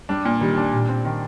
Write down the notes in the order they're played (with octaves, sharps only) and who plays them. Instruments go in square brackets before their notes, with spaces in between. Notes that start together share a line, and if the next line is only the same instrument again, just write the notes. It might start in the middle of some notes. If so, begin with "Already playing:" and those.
[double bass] G3 [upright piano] D4
[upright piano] A#2
[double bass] D#3 [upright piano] G3
[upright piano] D4
[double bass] A#2 [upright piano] G3
[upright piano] C4
D#3